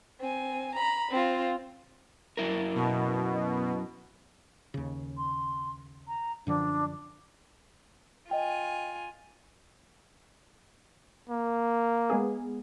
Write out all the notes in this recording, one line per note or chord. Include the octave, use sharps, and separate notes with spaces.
C4 G#5
A#5 B5
C4 F4
F#2 E4 A#4
B2
D#2 C#3
C6
A#5
F#2 D3 F3 D4
F4 D#5 G5 G#5
A#3
G#3 B3 G#4